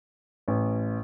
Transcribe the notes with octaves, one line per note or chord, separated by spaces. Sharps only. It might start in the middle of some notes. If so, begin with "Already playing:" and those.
A1